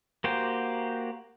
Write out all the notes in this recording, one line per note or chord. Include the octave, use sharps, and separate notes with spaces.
A#3 F#4 G4 C5